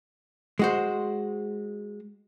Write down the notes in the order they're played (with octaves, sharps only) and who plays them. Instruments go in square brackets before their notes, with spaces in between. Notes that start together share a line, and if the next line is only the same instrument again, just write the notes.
[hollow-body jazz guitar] G#3 F#4 C5